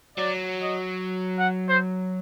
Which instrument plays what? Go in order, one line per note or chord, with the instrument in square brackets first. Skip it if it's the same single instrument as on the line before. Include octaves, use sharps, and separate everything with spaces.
[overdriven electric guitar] F#3 [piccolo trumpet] D5
[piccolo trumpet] D#5
F#5
C5